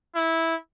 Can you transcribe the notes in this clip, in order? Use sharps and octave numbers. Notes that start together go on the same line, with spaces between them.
E4